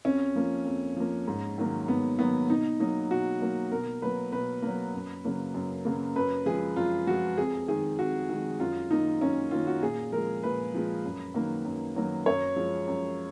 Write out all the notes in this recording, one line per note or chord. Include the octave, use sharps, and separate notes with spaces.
F2 C#4
F3 A#3
F2
F3 A#3
G#2
D#3 F#3 A#3
G#2 B3
D#3 F#3 A#3 B3
B2 D#4
F#3 A#3 D#4
B2 F#4
F#3 A#3
B2 A#4
F#3 A#3 B4
B2 B4
F#3 A#3
F#2
C#3 F#3 A#3
F#2
C#3 F#3 A#3
F#2 B4
F3 G#3 G#4
F#2 F4
F3 G#3 F#4
F2 G#4
D#3 G#3 G#4
F2 F#4
D#3 G#3
F#2 F4
D#3 A#3 D#4
F#2 C#4
D#3 A#3 F4
F#4
A#2 G#4
F3 G#3 A#4
A#2 B4
F3 G#3
F#2
D#3 F#3 A#3
F#2
D#3 F#3 A#3
F#2 C#5
F3 G#3
F#2